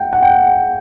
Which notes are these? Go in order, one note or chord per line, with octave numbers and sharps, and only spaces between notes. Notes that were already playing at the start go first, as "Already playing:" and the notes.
Already playing: F#5 G5
F#5
G5